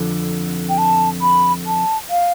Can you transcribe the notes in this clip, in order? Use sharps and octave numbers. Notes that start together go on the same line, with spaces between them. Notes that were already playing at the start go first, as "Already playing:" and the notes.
Already playing: F2 D3
G5
A5
B5
A5
F5